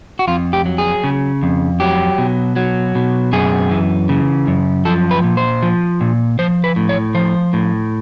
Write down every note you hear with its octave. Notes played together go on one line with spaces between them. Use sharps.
F#4
F2 F4
G4
F#3
G#4
C#3
F2
F#3 G4
B2
F#3
B2
F#2 G#4
E3
C#3
F#2
F3 A4
B4
A#2
C5
F3
A#2
F3 C5
B4
A2
C#5
F3 C5
A2